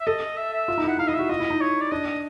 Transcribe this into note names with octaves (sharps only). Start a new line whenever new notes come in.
E5
A4 D#5
E5
E5
F4
D#4
E4
F#5
D#4 F5
E4 D#5
F#4 E5
F4 D#5
E4
D#4
C#5
D5
D4 D#5
D#5